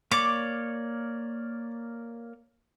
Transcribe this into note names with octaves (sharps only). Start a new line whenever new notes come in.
A#3 C#5 D5 D6